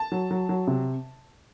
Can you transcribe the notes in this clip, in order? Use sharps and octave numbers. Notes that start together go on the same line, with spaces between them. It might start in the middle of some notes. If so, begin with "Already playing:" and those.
Already playing: A5
F#3
F#3
F#3
C3